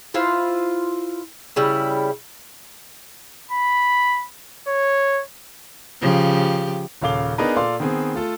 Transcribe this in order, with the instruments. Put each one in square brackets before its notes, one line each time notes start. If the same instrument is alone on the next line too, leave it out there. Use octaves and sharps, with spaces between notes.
[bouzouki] E4 F4 B4 C5
C#3 G3 E4
[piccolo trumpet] B5
C#5
[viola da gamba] C#3 F3 G4
[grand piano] D#1 C#3 A4 F5 D6 G7
B3 D4 D#4 G#4 A#4 B4
A#2 A4 D5 F5 C6
D#3 B3 C4 G#4
A3 F4 A4